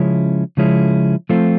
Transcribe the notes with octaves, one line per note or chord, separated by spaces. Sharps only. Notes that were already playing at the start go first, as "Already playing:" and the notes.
Already playing: C#3 F3 G#3 C#4 E4
C#3 F3 G#3 C#4 E4
F3 A3 C4 F4